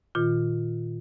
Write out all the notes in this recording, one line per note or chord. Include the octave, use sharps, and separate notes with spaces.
A#2 D#3 F4